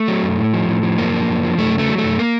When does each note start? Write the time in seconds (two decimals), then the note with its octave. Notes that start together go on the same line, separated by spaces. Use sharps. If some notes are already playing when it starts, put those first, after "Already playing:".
Already playing: A3
0.08 F#3
0.23 F#2
0.38 A2
0.53 F3
0.68 A2
0.83 F3
0.98 F#2 A#3
1.13 F3
1.28 F#2
1.43 F3
1.58 F#2 A3
1.73 C#3
1.78 A3
1.88 F#3
1.98 A3
2.04 F#2
2.19 A#3